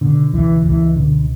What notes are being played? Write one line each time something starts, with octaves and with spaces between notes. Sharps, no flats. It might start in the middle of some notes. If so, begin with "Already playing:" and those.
B2 D3
C#2 E3
C#2 E3
B2 D3